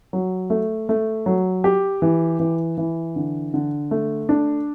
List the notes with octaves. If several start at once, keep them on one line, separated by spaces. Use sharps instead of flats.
F#3
A3
A3
F#3
G4
E3
E3
E3
D3
D3
A3
D4